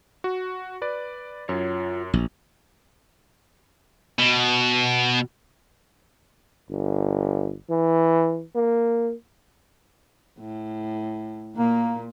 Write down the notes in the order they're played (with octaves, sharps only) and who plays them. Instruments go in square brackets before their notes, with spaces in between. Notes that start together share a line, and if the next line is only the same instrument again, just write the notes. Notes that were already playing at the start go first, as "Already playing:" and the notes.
[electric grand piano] F#4
B4 D5
[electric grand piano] F#2 [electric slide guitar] F4 C#5
[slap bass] A#1
[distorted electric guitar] B2
[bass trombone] G1
E3
A#3
[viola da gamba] A2
[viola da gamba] A#2 [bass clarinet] A#3